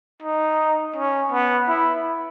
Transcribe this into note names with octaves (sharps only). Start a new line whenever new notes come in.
D#4
C#4
B3
E4